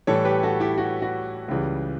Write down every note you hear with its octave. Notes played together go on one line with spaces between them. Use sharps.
A2 E3 G3 A4 C#5
G4 B4
F#4 A4
E4 G4
F#4
F#4
C#2 C#3 E3 G3